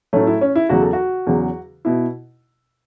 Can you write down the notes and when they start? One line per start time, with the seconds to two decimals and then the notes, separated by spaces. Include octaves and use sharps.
0.13 A2 F#3 A3 C#4
0.27 E4
0.41 C#4
0.56 E4
0.69 E2 C#3 F#3 F#4
0.81 A4
0.93 F#4
1.27 E2 C#3 F#3
1.85 B2 E4